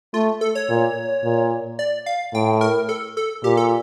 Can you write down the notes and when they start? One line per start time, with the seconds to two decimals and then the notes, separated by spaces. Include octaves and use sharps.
0.14 A3 F4
0.41 A4
0.55 C#5
0.69 A#2
1.24 A#2
1.79 D5
2.06 F5
2.34 A2 G5
2.61 A#4
2.89 A4
3.17 A4
3.44 A#2 G4
3.57 A4